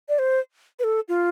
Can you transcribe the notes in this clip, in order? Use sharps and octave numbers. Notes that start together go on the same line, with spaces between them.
D5
C5
B4
A4
F4